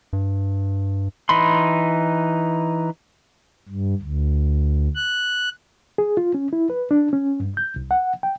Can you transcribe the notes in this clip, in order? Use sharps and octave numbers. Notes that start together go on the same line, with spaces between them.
G2
E3 D#4 B5 C6
G2
D2
F#6
G#4
F4
C#4
E4
B4
D4
C#4
G2
G6
C2
F#5
G5